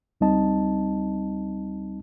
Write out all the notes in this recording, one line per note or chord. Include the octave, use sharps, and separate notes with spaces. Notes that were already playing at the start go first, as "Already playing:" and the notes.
C#2 G3 C4 D#4 D#5 A5